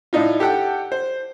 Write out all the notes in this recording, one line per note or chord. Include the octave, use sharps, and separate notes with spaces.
A2 D4 D#4 F4
G4 A4 F#5 G5
C5